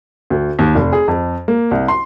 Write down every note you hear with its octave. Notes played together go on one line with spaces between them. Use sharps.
D2
D#2
F1
G#4
F2
A#3
C2
C6